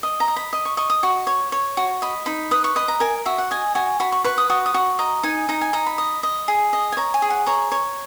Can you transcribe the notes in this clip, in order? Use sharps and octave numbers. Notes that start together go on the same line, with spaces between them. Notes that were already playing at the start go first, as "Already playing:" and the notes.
D#5
A#5
D#5
B5
D#5
C#6
D#5 C#6
D#6
F#4 C#6
C#5
C#5
F#4
D#5 B5
D#4 B5
B4 D#6
C#6
D#5 B5
A#5
A#4 G#5
F#4 E5
F#5
D#5 G#5
F#4 G#5
F#4 B5
C#6
B4 C#6
D#6
F#4 D#6
D#6
F#4 C#6
D#5 A#5
D#4 G#5
D#4 A#5
G#5
D#4 A#5
B5
D#5
D#5
G#4
D#5
G#5
C#5 A#5
G#5
G#4
F#5
C#5 A#5
C#5